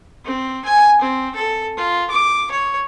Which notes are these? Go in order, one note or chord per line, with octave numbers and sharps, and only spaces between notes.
C4
G#5
C4
A4
F4
D6
C#5